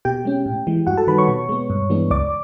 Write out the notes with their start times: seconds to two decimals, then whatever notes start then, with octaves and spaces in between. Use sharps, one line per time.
0.05 B2 G4 G5
0.25 G#3 C#4
0.46 A2
0.67 E3 G#3
0.87 G2 F#4 F#5
0.97 A4 A5
1.07 D#3 G3 B4 B5
1.18 C#5 C#6
1.28 B2
1.49 G#3 B3
1.70 G2
1.90 E3 G#3 B3 D4
2.11 C#2 D5 D6